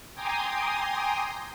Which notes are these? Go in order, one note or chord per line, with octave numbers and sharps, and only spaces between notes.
G5 G#5 A#5 C6 D6 D#6